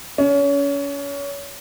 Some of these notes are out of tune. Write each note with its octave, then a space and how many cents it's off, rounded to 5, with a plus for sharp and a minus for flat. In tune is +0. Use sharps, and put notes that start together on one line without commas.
C#4 +30